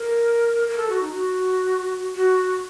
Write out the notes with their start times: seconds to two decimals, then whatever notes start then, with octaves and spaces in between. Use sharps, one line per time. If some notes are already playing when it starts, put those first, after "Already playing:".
Already playing: A#4
0.68 A#4
0.78 A4
0.89 F#4
1.01 D#4
1.12 F#4
2.16 F#4